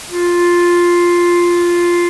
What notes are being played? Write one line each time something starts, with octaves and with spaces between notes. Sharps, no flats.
F4